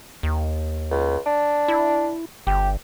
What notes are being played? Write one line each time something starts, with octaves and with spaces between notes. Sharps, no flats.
D#2
C#2
D4
E4
G1 G4